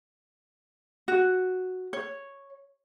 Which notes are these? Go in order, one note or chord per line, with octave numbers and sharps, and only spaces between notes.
F#4
C#5